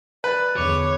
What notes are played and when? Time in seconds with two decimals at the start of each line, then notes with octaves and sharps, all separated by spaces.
0.24 B4 D5
0.56 E2 D3 C#5 D6